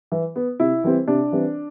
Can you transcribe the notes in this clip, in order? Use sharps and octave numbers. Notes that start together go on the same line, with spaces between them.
E3
B3
C3 E4
E3 G3 C4
C3 D4
E3 G3 C4